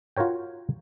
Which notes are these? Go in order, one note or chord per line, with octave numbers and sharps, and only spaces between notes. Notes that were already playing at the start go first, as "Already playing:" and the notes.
F4 F#4 A#4 C#5 G5